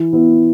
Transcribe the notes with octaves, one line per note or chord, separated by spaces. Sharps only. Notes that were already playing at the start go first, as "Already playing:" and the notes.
Already playing: E3
B3 E4